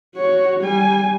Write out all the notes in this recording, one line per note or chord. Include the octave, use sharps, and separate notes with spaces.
F#4 C#5
G3 G#5